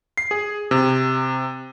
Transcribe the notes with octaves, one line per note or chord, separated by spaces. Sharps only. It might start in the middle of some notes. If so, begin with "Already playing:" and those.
C7
G#4
C3